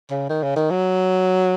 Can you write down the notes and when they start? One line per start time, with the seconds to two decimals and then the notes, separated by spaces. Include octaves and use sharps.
0.10 C#3
0.30 D#3
0.43 C#3
0.56 D#3
0.71 F#3